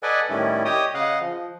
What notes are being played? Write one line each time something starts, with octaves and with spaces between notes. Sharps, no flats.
A4 B4 D5 D#5 F#5 G#5
A2 D#3 G3 C#4 E4
G4 C#5 D#5 G5 D#6
C#3 D#5 F5 F#5
F3